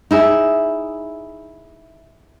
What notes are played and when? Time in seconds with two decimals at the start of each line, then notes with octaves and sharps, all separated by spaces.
0.11 D#4 E4 G#4